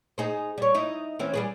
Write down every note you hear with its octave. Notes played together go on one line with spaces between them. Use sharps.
D#4 G#4 C5
G3 C#5
D#4 E4
E3 C4 C#4
G3 G#4 B4